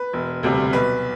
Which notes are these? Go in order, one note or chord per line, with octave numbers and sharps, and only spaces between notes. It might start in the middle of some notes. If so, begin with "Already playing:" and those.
Already playing: B4
E1
D2 C3 G3
B1 B4